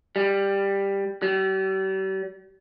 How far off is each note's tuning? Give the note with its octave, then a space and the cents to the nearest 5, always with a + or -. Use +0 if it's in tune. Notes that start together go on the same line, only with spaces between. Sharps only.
G3 +10
G3 -40